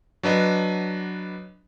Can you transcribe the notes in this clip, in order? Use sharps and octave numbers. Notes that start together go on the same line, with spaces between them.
F#3 D4 B4 D#5